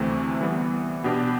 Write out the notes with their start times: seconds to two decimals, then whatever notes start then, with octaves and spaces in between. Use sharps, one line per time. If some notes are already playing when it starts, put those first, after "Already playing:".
Already playing: D2 C3 E3 A3 C4
0.41 E3 G3 B3
1.04 B2 B3 D4 G4